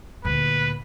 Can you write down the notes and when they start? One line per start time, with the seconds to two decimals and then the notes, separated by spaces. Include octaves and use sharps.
0.25 D2 A#2 B4